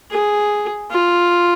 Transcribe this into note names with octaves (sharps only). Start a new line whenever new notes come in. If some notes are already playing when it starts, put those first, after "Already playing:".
G#4
F4